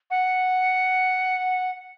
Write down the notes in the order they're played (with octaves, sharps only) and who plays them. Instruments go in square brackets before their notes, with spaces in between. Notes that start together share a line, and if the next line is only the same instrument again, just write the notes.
[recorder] F#5